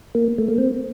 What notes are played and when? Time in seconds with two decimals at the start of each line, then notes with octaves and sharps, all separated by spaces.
0.15 A#3
0.38 A3
0.48 A#3
0.58 C4